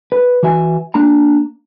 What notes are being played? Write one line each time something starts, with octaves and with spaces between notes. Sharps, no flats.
B4
E3 F#4 E5 G#5
A#3 D4 A5 A#5